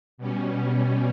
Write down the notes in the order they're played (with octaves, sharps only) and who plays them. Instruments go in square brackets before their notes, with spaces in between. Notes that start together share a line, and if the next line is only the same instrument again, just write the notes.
[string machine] B2 G3 C#4